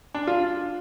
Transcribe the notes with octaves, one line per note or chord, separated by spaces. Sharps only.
D4
F4